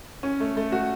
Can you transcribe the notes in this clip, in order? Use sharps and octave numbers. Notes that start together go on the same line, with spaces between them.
C#4
A3
A3
F#4